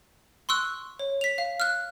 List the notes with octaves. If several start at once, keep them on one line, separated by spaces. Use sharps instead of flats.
C6 C#6 E6 F#6
C#5
B6 F7
F5
F6 F#6